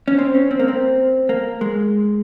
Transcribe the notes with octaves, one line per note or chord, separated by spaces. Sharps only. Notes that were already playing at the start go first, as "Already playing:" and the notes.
C#4
C4
C#4
C4
A#3
C4
A#3
G#3